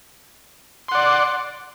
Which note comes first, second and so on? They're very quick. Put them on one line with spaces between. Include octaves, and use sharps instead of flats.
C6 F#5 D5